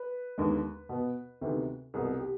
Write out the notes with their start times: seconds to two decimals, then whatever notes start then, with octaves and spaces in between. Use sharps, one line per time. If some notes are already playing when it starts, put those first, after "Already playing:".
Already playing: B4
0.38 D#2 D3 G#3 B3
0.89 B2 B3
1.41 D2 C3 D#3 B3
1.94 C2 B2 B3 G#4
2.19 G4